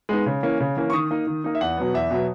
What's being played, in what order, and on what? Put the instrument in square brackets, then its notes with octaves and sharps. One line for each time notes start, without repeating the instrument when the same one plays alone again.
[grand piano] G#3 B3 D#4
C#3
E3 A#3 C#4
C#3
E3 A#3 C#4
C#6
D#3 D#6
A#3 D#4
D#3
A#3 D#4
E5
E2 F#5
B2 F#3 B3
E2 E5
B2 F#3 B3